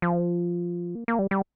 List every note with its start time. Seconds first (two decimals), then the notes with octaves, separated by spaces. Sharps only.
0.02 F3
0.95 A#3
1.08 A#3
1.19 G3
1.31 G3